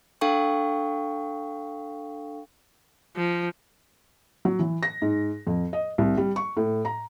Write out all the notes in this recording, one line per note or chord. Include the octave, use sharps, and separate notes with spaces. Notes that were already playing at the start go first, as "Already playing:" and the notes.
D4 A4 F5 G5 C#6
F3
F#3
E3
A#6
G#2
F2
D#5
C2
G3
C#6
A2
A#5